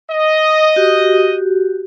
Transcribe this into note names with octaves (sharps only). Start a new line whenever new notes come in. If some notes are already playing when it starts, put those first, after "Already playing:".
D#5
F#4 G4